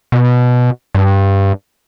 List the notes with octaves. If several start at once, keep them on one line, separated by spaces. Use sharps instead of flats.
B2
G2